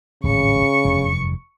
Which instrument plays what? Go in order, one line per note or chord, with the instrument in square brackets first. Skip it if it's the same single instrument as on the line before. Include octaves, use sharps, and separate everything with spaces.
[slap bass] D1 G#1 A2 [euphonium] C#3 [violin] C#6 C#7
[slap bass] F1 E2 G2